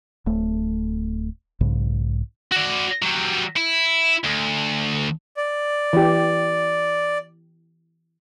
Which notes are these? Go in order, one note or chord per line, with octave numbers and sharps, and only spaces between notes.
D1 A3
B1 G#2 C#3
F#4 D5
F#3 G3
E4
D2
D5
E3 G4